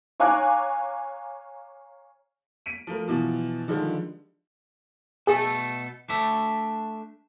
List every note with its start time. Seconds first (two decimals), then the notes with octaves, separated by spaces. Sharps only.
0.20 C#5 F5 G#5 A#5 D6 F#6
2.66 B6 D7 D#7
2.87 F3 A3 A#4
3.08 B2 E3 F3
3.68 D3 D#3 F3 G3 G#3
5.27 B2 A3 G#4 A4
6.09 A3 D4 E5